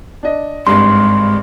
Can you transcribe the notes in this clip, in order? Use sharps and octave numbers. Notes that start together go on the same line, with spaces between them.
D4 D#5
G#1 G2 G#3 C6